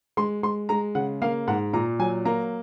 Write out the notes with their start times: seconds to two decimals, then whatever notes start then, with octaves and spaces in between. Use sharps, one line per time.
0.17 G#3 C6
0.43 G#3 C6
0.69 G#3 A#5
0.95 C#3 F#5
1.22 A#3 F5
1.47 G#2 F#5
1.73 A#2 A#5
1.99 F#3 G#5
2.25 A#3 A#5